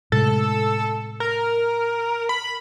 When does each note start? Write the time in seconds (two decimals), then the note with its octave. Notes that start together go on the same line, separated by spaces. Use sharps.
0.12 A2 C3 G#3 A4
1.20 A#4
2.29 B5